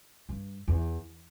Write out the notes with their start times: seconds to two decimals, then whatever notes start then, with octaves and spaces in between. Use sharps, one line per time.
0.29 G2
0.68 E2